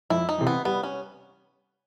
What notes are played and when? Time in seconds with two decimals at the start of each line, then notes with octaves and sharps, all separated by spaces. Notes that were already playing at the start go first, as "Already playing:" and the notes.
0.10 F2 E4
0.29 D#4
0.38 C3 E3
0.47 B3
0.65 G3 B3
0.83 C#4